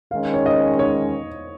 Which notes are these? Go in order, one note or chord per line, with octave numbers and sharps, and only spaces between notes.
D#3 G#3 C#4 F5
C#5
D#5
C#5